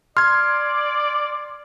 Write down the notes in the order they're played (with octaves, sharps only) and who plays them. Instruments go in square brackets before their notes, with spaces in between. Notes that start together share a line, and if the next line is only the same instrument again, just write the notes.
[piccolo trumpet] D5 [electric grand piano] C6 G#6 [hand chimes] F6